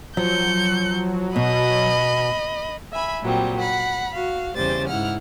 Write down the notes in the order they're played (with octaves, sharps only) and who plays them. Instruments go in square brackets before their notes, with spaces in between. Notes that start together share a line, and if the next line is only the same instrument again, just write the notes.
[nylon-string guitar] F3 [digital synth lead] F#3 [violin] G6 C#7
[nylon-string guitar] B2 [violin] D#5 B5
[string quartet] E5 G#5 B5
A#2 F#3 G3 C4
F#5 B5
F#4 F5
E2 C#3 G3 C5 A6
G#2 E4 F#5 F6